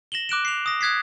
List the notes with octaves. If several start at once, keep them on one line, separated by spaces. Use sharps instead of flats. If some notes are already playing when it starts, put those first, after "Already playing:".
A#6 E7 F#7 G7
D6 F#6 D7 E7
C7 F7
D#6 A#6
D#6 F#6 G#6 B6 C7